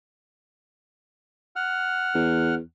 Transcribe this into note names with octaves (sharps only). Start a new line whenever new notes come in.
F#5 F6
E2